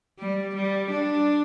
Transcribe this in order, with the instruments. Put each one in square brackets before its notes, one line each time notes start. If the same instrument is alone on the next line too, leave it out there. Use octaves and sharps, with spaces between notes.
[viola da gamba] G3
G3
D4